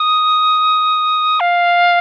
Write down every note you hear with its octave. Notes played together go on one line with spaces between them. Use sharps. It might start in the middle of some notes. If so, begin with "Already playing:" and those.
Already playing: D#6
F5